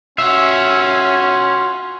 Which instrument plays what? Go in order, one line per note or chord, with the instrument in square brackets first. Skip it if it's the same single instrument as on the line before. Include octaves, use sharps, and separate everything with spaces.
[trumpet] C#4 [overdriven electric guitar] F4 F#4 [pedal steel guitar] E5